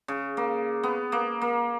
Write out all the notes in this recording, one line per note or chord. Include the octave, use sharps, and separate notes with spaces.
C#3
A#3
B3
A#3
A#3